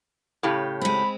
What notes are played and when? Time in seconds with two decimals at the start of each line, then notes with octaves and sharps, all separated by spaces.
0.43 A2 C#3 G4
0.81 G#3 C4 B5